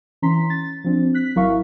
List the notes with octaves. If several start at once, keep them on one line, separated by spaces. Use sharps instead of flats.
E3 C#4 A#5 C6 B6
A6
F3 C4 D4
F#6 B6
G#1 F#3 E4 A#4 F5 C#6